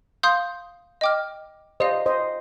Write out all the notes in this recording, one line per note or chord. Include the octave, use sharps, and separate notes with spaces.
F5 C6 D#6 G6
D#5 G5 D6 F6
G4 C5 D5 D#5 F5
C5 D#5